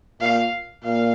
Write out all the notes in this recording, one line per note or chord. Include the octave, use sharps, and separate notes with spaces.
A#2 F5
A#2 F5